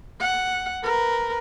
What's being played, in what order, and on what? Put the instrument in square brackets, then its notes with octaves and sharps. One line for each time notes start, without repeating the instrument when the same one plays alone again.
[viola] F#5
A#4 B4